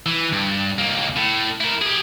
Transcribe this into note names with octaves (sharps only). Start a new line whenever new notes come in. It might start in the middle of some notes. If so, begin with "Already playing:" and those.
E3
G2
C#2 A#3
A2
E4 A#4
G4 G#4